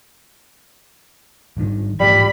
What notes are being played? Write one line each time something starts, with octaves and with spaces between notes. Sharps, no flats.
G#1 G2 D#3
A1 G#2 F3 G3 B5